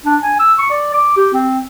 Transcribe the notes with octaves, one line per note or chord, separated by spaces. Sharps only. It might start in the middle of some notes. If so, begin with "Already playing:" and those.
D4
G#5
E6
C#6
D5
D6
G4
C4